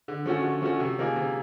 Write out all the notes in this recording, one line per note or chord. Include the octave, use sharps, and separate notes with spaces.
D3
F3 A3 C#4 F#4
D3
F3 A3 C#4 F#4
C3
F3 A#3 D#4 G#4
C3